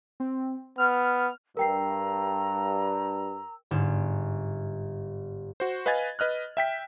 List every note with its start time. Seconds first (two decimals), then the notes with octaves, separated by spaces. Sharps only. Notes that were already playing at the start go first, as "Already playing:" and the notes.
0.20 C4
0.78 B3 F6
1.57 G2 A#4 G5 A#5 E6 C7
3.71 G1 G#2 E7
5.60 F#4 C5
5.86 B4 D#5 F5 G#5 G#6 A6
6.19 B4 D#5 F6 F#6
6.57 E5 G5 B6